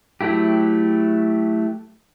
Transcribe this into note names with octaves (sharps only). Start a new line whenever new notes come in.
F#3 A3 E4 G4